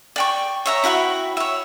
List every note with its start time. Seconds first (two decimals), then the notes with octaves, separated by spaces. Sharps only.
0.16 D5 G5 C#6
0.66 C#5 E5 A#5
0.84 E4 F#4 G5 B5
1.37 C#5 E5